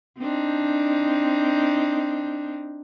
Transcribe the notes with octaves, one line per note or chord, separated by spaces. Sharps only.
C4 D4 D#4